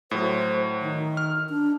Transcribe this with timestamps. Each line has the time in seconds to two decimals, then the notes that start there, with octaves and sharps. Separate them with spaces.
0.11 A2 F#3 C5
0.80 D#3
1.17 F6
1.49 D4